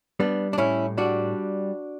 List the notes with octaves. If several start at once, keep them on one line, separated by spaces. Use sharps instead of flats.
G3 B3 D4
D4
A2 C#4 E4
G3 D4 F#4